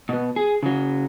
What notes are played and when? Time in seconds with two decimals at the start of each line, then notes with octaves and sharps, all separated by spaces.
0.09 B2 B3
0.36 G#4
0.63 C#3 F#3